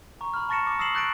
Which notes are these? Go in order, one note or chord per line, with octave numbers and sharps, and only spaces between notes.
A#5 C#6
B5 F6
A5 C#6 A6 A#6 C#7 E7
D6 C#7
D#6 E6 A#6 C7 E7 F#7
C#6 F#6 G6 A6 A#6 D7